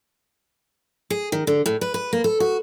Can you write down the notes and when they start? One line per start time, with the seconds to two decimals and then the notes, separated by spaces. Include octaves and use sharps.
1.10 G#4
1.32 D#3
1.47 D3
1.66 A2
1.81 B4
1.94 B4
2.13 A#3
2.24 A4
2.40 F#4